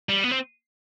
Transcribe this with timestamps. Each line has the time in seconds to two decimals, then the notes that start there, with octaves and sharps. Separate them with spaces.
0.09 G3
0.24 B3
0.31 C4